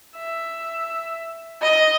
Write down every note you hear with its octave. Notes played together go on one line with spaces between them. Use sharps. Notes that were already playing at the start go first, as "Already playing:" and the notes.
E5
D#5